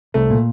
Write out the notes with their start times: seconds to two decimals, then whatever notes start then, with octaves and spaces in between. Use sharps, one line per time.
0.14 C2 A3
0.30 A#2